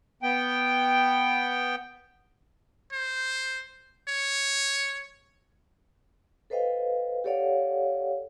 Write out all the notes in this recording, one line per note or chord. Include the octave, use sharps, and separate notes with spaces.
B3 G5
C5
C#5
A4 B4 C5 D#5 F5 G5
G4 A4 C#5 D5 F5 F#5